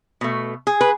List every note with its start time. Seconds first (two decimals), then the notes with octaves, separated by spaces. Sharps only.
0.21 B2 A3
0.67 G#4
0.81 B4